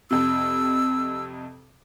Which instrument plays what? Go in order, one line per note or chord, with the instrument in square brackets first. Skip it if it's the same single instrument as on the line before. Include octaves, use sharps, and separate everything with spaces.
[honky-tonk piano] F2 C3 [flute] E6